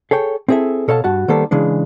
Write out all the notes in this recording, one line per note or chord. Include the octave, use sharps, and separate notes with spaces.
G#4 A4 C#5 G5
C4 E4 G#4 A4 E5
B2 A4 C#5 F5 A5
G2 F#4 A5
D#3 G3 A#3 B3 A4 C5
C#3 E3 G#3 D4